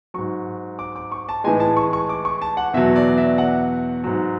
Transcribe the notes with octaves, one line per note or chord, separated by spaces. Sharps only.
G#2 F#3 C#6
D6
D6
C#6
A5
A2 E3 G#3 G#5
A5
C#6
C#6
D6
C#6
A5
F#5
E2 B2 F#3 E5
D5
E5
F#5
G#2 F#3